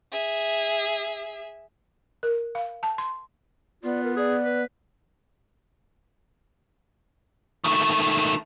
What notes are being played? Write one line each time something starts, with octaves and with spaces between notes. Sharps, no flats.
G#4 E5
A#4
F5
A5
C6
B3 F4 D5
A#4
G#4 D5
B4
D#3 A3